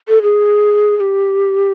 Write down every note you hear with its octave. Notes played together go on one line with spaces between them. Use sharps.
A4
G#4
G#4
G4